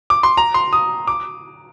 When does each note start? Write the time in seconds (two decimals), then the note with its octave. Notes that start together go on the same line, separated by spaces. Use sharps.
0.10 D6
0.23 C6
0.37 A#5
0.54 C6
0.73 D#6
1.07 D6